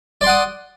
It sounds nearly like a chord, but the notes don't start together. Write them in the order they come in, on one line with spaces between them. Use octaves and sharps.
D5 C6 F#5 D#6